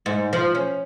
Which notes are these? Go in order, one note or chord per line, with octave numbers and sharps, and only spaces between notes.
G#2
F3
C#4